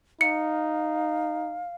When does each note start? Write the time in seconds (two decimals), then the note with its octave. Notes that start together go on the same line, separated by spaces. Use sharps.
0.21 D#4 F5 C#7